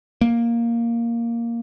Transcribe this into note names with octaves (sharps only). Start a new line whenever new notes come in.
A#3